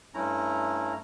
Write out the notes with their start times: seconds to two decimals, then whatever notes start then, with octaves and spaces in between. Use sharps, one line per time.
0.14 G2 A3 C#4 E4 A#5